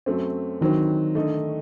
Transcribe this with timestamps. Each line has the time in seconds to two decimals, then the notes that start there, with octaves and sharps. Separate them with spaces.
0.06 F#2 F#3 A3 C4
0.61 D3 D#3 F#3 C4
1.15 D3 A3 D#4